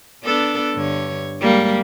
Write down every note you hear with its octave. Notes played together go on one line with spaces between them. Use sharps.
B3 D4 A4
G2 D3 C#5
G3 G#3 A#3